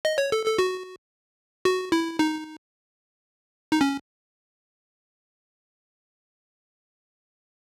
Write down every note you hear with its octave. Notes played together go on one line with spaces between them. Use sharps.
D#5
C#5
A4
A4
F#4
F#4
E4
D#4
D#4
C#4